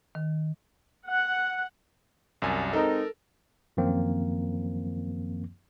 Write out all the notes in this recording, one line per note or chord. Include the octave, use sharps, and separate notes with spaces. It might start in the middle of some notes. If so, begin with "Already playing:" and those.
D#3
F#5
C2 F#2 G#5
G#3 C4 D#4 A4 A#4
F#2 D#3 F3 A#3 C4